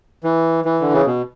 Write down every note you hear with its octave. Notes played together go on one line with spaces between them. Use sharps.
E3
E3
D3
C#3
B2